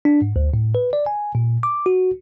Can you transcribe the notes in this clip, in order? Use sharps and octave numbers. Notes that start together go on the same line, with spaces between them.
D4
G#2
D2
A2
B4
D5
G#5
A#2
D6
F#4